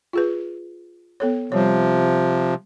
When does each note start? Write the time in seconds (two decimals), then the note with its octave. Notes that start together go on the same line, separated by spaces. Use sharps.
0.13 F4 G#4 B4
1.20 B3 A4 C#5
1.52 C3 F3 G3 C#5